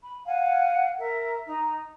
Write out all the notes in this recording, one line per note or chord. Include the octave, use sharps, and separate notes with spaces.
B5
F5 F#5 G#5
A#4 E5
D#4 A#5